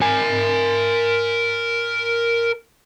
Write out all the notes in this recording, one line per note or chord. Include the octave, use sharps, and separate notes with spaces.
A#4 G#5